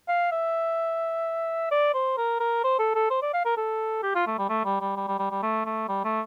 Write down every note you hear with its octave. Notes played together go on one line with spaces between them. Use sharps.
F5
E5
D5
C5
A#4
A#4
C5
A4
A4
C5
D5
F5
A#4
A4
G4
F4
A3
G3
A3
G3
G3
G3
G3
G3
G3
A3
A3
G3
A3